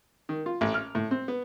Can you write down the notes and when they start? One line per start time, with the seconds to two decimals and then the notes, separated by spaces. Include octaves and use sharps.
0.29 D#3
0.46 F4
0.61 A1
0.74 F6
0.95 A2
1.11 C4
1.28 B3